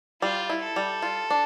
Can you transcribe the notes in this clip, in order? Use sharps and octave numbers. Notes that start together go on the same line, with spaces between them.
G3 F4
E4
A4
G3
F4
D4